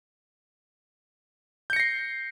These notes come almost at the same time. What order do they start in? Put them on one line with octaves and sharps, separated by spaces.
G6 C#7 A#6 C7